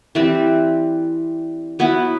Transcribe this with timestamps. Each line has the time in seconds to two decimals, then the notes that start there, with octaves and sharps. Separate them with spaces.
0.15 E3 G3 C4
1.79 F#3 B3 E4